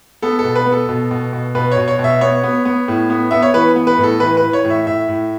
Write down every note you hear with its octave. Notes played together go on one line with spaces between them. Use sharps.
B3 A4
A4
B2
B4
B3
A4
B2
B2
B2
B2 B4
C#5
B2
C#5
B2
E5
B3 C#5
B3
B3
A2
B3
B3 E5
C#5
E3 B4
B3
B4
A2
A4
E3 B4
B4
E3
C#5
A2
E5
A2 E5
A2